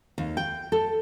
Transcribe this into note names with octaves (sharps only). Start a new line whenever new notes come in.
D#2
G5
A4